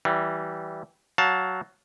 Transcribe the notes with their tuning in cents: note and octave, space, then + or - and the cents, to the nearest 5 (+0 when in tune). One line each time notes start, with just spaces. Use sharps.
E3 -10 G3 -25
F#3 +10 F5 +25 A5 +0